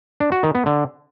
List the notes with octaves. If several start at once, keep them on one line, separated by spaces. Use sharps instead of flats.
D4
F#4
D#3
B3
D3